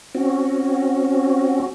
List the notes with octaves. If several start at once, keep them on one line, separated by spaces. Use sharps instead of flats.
C4 C#4 F#4